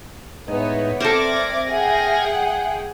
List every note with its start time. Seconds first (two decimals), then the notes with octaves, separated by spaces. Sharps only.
0.48 A2 G#3 B3 D#4 C#5 E5
1.00 C4 A4 A#4 C5 D5 D6 G#6 A#6
1.70 G#4 F#5 G5